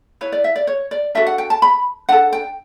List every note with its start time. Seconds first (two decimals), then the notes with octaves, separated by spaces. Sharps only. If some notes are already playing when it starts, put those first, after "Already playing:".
0.21 E4 B4 C#5
0.32 D5
0.44 E5
0.56 D5
0.67 C#5
0.91 D5
1.15 D4 F#4 A4 E5
1.27 F#5
1.38 G5
1.50 A5
1.62 B5
2.09 D4 A4 F#5
2.33 G5